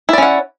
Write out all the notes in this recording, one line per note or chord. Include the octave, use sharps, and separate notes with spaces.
C#4 E4 D5 F#5